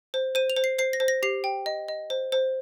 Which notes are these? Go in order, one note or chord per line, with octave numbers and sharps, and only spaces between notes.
C5
C5 D#7
F7
C5
C7
C5 C7
A#6
C5
A#6
G4 C7
G5
D#5
D#5
C5
C5